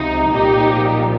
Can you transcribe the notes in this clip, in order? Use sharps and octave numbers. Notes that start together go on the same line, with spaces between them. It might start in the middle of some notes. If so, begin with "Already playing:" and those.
Already playing: C#2 C3 F3 D#4
C2 A#2 F3 D#4 G4